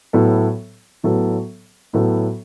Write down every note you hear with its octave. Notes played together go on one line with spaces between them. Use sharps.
A2 F#3 B3 A4
A2 F#3 B3 A4
A2 F#3 B3 A4